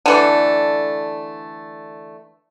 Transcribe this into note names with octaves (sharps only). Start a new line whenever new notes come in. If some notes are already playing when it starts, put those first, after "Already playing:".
D3 E3 A3